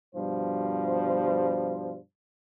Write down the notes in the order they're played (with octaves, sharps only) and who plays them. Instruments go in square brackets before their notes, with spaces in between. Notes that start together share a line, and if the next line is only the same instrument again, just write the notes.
[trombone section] G2 B2 F3 G3 C5